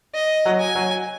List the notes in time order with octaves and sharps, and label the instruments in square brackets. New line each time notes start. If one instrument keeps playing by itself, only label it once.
[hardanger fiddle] D#5
[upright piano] F#3
[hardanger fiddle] G#5
[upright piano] F#3